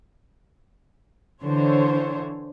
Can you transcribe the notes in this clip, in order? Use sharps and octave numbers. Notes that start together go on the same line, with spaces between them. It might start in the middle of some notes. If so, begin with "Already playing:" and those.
D3 E3 C5 C#5